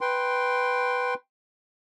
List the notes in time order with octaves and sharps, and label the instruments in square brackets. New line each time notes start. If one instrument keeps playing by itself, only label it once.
[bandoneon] B4 G5 C6